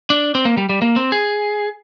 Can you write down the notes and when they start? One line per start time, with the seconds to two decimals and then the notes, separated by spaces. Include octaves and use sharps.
0.10 D4
0.35 C4
0.45 A#3
0.57 G3
0.69 G3
0.82 A#3
0.96 C4
1.12 G#4